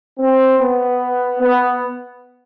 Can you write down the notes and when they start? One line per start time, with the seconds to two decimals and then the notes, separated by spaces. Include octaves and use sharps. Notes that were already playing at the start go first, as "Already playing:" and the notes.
0.19 C4
0.59 B3
1.39 B3